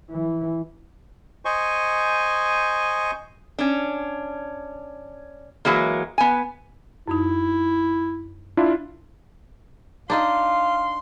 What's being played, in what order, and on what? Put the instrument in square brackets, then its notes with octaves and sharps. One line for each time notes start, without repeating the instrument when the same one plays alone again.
[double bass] E3
[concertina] C5 D#5 G#5 C#6
[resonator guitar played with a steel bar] C#4 D4
E3 F#3 G#3 A#3
B3 G#5
[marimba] F#2 D#4 [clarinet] E4
[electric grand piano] D4 E4 F4
[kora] D4 D#4 D#5 [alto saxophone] F5 [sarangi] C6